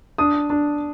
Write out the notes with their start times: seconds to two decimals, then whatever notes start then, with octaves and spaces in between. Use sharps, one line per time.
0.18 D4 D#6
0.50 D4